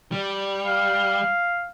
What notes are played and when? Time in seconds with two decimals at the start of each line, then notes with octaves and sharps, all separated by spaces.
0.12 G3
0.65 F5